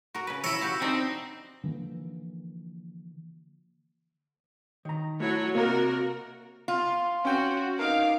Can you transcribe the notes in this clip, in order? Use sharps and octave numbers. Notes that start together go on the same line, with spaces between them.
F#4 A#4
C#3 B4
E4 C#5 E6 A#6
F#4 G4 F5
C4 D4 D#4 E5
D3 E3 F3 A#3
D#3 A#5
F#3 A3 E4 F#4 C#5
C3 A#3 F#4 A#4 D#5
F4
C#4 F#4 G5
D#4 A#4 F5 D6